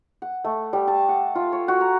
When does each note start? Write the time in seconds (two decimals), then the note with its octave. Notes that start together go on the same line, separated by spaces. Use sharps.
0.22 F#5
0.44 A3
0.73 G3
0.88 A5
1.09 F#5
1.35 F4
1.52 C#5
1.68 F#4
1.81 A#5